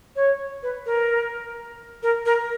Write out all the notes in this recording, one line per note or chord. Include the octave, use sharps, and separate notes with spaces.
C#5
B4
A#4
A#4
A#4